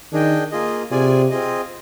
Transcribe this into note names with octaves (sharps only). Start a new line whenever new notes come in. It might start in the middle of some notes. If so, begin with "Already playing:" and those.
D#3 D4 G#4 D#5 G5
A#3 F4 G#4 D#5
C3 F4 G#4 D5 G#5
C4 F4 G#4 D#5